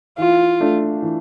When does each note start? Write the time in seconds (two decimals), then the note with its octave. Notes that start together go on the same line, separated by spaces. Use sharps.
0.18 E3 F4
0.60 A3 D4
1.02 E3